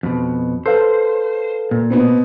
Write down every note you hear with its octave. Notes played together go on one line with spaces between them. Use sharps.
F2 B2
A4 B4 C5 F5
A#2
B2 B3 C4